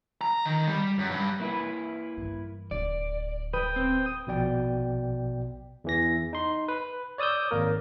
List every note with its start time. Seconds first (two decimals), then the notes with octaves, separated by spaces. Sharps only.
0.21 A#5
0.45 D#3
0.68 G3
0.99 F#2
1.11 G2
1.40 A#3 E4 B4
2.17 G2 E3
2.71 D1 D5
3.53 B4 G5 D#6
3.76 C4
4.27 A#1 B2 D5 G5
5.84 E2 E3 A#6
6.33 D#4 C6
6.68 B4
7.18 C#5 D5 D#6 E6 G6
7.51 G#1 A#3 A#4